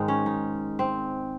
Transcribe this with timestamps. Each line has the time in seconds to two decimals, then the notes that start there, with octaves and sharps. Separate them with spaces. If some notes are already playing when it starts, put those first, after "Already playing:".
Already playing: G#2 D#3 G#3 D#4
0.08 C#4
0.26 D#4
0.79 C4